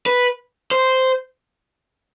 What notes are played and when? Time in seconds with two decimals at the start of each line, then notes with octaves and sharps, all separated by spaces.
0.06 B4
0.71 C5